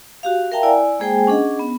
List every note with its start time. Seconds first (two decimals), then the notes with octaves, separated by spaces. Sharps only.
0.23 F#4 G4 F5
0.52 A#4 E5 F5 G5 A5 A#5
0.63 E4 D5 G#5
1.00 G#3 A#3 G#4 C5 G5 G#5
1.27 C#4 D4 G#4 D#5 F#5
1.59 B3